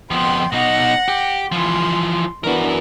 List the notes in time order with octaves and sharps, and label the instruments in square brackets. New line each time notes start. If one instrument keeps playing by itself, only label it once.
[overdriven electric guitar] F2 B3 [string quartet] G5 C6
[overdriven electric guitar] B2 D#4 [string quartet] F#5 A#6
[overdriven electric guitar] G4
[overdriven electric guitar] E3 F3 [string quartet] C6
[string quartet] E3 B3 D4 [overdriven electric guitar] F#4 A#4